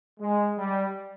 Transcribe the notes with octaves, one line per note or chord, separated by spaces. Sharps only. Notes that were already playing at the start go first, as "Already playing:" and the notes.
G#3
G3